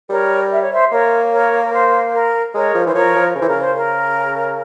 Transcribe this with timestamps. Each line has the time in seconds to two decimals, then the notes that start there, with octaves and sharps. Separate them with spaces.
0.10 G3 A#4 C#5
0.52 E5
0.62 C#5
0.72 C5 E5
0.92 A#3 A#4 C#5
1.32 A#4 C#5
1.65 A#4
1.73 C5
2.13 A#4
2.54 G#3 A#4 C#5
2.75 F3
2.86 E3 C5
2.95 F3 A#4 C#5
3.15 F3
3.35 C#3 C5
3.42 E3
3.46 C#3 A#4
3.58 C5
3.76 A#4